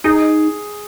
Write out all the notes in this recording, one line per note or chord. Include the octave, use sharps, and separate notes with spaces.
D#4 G#4